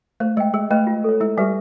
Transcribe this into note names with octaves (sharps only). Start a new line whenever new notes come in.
A3 C5
G#3 D#5 G5
G#3 G#4
A3 B4 D#5 G5 B5
F4
A4 C#5
G#3 E4
G3 G4 B4 E5 G#5